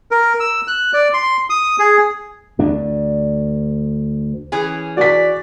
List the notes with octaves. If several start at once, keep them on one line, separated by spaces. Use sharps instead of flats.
A#4
E6
F#6
D5
C6
D#6
G#4
D2 D4
E3 C#4 G#4
F#4 D5 B6